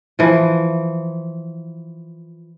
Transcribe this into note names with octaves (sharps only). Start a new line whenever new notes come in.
E3 F3